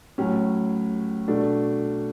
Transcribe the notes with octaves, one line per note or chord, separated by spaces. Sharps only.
A2 F#3 C#4
B2 A3 D4